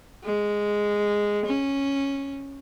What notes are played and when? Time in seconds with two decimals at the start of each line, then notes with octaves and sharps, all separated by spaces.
0.24 G#3
1.46 C#4